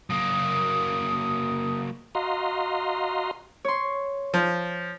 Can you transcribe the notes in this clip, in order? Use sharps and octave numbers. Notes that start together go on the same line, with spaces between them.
F#3 A#3 D#6
F#4 D#5 F5 A#5 C6
C#5 C6
F3